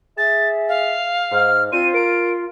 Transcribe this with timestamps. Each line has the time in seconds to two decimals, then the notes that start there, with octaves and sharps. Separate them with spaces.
0.18 G#4 E5 A6
0.69 F5
1.32 G#2 F6
1.72 C4 D4 F4 C5 D#7
1.94 A#4 D7